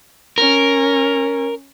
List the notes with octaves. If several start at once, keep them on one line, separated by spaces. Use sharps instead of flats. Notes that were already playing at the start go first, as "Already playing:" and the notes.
C#4 A#4